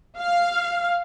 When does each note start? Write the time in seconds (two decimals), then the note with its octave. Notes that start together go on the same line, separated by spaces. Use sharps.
0.19 F5